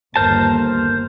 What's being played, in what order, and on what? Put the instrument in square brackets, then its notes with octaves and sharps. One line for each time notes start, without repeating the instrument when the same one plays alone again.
[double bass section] G1 D#2 [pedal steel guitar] A#4 C5 A5